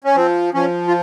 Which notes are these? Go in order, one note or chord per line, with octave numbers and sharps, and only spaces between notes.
C#4
F3 C4
F3 C#4
F4